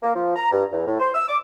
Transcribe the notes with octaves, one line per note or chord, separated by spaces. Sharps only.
A#3
F3
A#5
G2
E2
A2
C5
E6
D6